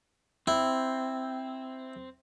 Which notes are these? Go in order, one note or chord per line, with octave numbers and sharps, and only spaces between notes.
C4 E4